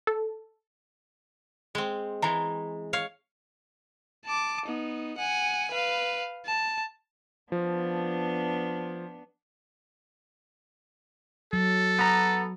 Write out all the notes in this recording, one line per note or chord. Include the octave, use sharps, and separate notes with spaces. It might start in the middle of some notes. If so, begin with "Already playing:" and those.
A4
G#3 C4
E3 G#3 A#5
C#5 F5
A5 D6
B3 D#4
F#5 G#5
B4 F5
A5
F3 B3 D4
F#3 A4
B3 A#5